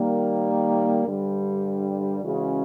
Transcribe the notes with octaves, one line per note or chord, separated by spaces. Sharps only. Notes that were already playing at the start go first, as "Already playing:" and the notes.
Already playing: D#3 G3 A#3
G2 D3 G3
C#3 E3 G#3 C#4 F#4